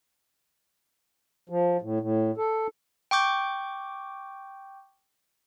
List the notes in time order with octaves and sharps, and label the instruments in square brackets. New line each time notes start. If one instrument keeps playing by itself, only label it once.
[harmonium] F3
A2
A2
A4
[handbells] G5 C#6 D6 G6